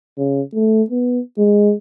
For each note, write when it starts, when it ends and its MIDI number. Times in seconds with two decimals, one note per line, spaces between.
0.17 0.42 49
0.54 0.83 57
0.90 1.20 59
1.38 1.73 56